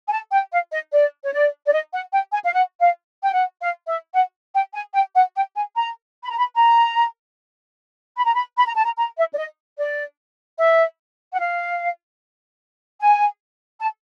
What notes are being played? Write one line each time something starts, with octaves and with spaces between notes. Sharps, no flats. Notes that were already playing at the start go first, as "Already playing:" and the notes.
G#5
A5
G5
F5
D#5
D5
C#5
D5
D5
D#5
F#5
G5
G#5
F5
F#5
F5
G5
F#5
F5
E5
F#5
G5
G#5
G5
F#5
G5
G#5
A#5
B5
A#5
B5
A#5
B5
A#5
B5
B5
A#5
A5
A#5
A#5
E5
D5
D#5
D5
E5
F#5
F5
G#5
A5